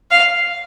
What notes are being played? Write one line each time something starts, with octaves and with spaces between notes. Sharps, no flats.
F5